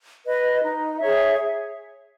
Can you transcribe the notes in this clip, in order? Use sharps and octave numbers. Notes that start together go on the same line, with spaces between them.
B4 D#5
D#4
G#4 C#5 E5